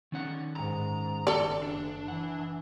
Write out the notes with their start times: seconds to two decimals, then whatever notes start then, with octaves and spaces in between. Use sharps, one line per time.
0.12 D#3 C#4 F#5
0.56 G#2 A#5
1.27 F#1 F#2 A4 D5
1.63 D4
2.08 E3 F#5